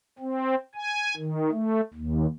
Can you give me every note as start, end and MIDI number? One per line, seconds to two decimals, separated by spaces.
0.19 0.55 60
0.75 1.15 80
1.17 1.50 51
1.51 1.81 57
1.94 2.26 39